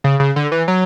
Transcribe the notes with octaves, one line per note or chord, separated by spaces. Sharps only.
C#3
C#3
D3
E3
F#3